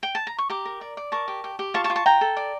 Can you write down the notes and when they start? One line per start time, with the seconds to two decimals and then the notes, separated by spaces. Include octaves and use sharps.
0.03 G5
0.15 A5
0.27 A#5
0.38 C#6
0.50 G4 A#5 D6
0.65 A#4
0.81 D5
0.97 D5
1.12 A#4 A5 C#6
1.28 G4
1.44 G4
1.59 G4
1.74 F4 A5 C#6
1.84 A5 C#6
1.90 F4
1.96 A5 C#6
2.06 F4 G5 A#5
2.21 A4
2.37 D5